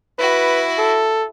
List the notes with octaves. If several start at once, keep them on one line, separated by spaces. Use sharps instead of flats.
E4 F#4 B4
A4